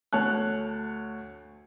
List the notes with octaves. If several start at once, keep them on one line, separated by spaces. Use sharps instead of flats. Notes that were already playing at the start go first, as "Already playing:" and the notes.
D2 C#5 A5 F#6